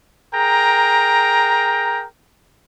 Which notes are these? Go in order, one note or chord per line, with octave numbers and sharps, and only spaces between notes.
G#4 A#4 G5 A#5